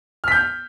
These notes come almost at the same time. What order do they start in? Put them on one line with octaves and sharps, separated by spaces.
F6 B6 G6